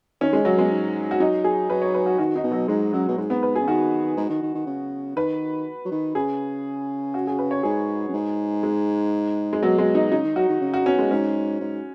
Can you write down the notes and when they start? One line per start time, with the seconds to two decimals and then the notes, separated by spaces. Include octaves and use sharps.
0.21 D#3 C#4
0.33 G#3
0.42 C#3 F#3
0.57 B2 G#3
0.70 G#2
1.11 F#4
1.20 F#3 D#4
1.44 G#4
1.70 F#3 B4
1.82 C#5
1.94 B4
2.06 F#4
2.18 D#3 F#4
2.36 D#4
2.43 B2
2.51 F#3
2.68 G#2 G#3
2.93 F#2 F#3
3.08 B2
3.17 G#2 G#3
3.30 B3
3.43 B4
3.55 G#4
3.61 C#3
3.68 D#3 F#4
4.17 G#2
4.29 D#3
4.42 D#3
4.54 D#3
4.66 C#3
5.16 D#3 B4
5.85 F#3
5.91 D#3
6.15 C#3 G#4
7.14 F#4
7.27 G#4
7.39 B4
7.51 C#5
7.63 G#2 G#4
8.08 F#2
8.13 G#2
8.63 G#3
9.53 G#3
9.63 B2 F#3
9.78 G#3
9.95 D#4
10.11 C#3 D#4
10.24 D#3
10.36 F#3 F#4
10.49 D#3
10.61 C#3
10.74 F#4
10.86 B2 C#4
10.99 G#3
11.11 G#2 C#4
11.61 G#2